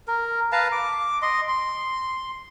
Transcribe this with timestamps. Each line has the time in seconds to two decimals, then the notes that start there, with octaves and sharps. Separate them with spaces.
0.08 A#4
0.52 B4 F5 A5 A#5
0.72 D6
1.22 D#5 C6
1.48 C6